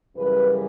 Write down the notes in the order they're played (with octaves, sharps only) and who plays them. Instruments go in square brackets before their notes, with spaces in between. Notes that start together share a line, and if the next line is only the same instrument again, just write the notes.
[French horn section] F#2 C#3 E3 G3 B4